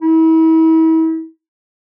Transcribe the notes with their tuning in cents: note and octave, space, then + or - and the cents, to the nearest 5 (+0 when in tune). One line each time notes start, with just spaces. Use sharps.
E4 -35